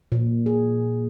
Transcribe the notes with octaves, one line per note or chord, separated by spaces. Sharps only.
A#2
G#4